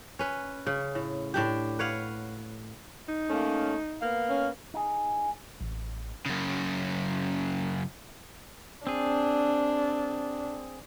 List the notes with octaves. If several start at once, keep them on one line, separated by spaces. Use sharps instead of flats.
C#4 B4
C#3
A2
A2 D4 G4
B4 C#5 F5 F#5
D#4
A3 A#3 C#4
A#3 B3 F5
C#4
D#4 G#4
A1
F#2 C#3
C4 D4 G#4